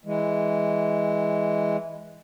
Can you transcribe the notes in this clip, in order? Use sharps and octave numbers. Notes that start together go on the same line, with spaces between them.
E3 G#3